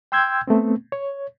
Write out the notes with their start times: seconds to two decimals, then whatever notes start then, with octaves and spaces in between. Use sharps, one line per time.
0.12 G5 C6 E6 G6 G#6
0.47 A3 B3 C4
0.92 C#5